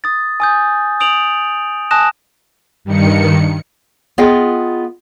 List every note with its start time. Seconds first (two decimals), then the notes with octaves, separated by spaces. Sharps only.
0.04 D#6 A6
0.40 G#5 D#6 G6
1.00 D#6 D7 F7 F#7
1.91 G#5 A5 D#6 F#6 A#6 E7
2.84 G2 D#3 C#7
4.18 B3 F4 G#4 D#5 G5